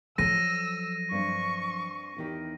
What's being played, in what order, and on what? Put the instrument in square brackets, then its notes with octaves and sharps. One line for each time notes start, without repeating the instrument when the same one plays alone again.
[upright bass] F3 F#3 [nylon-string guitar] A4 [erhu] E6 [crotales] A#6 D#7
[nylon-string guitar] G2 C4 [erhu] C#6
[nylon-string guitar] E2 D#3 G4